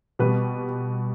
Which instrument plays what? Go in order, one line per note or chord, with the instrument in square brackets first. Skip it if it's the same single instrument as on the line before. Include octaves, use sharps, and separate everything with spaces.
[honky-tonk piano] B2 G3 B4